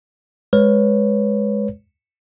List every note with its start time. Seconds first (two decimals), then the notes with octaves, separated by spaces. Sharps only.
0.53 G#3 B4 C#5